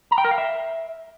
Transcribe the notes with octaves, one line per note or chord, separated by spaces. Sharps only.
A#5
G5
A#4
F5
E5